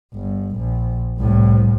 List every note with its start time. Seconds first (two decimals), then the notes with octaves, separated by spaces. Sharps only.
0.14 G1
0.57 A#1
1.18 C2 A2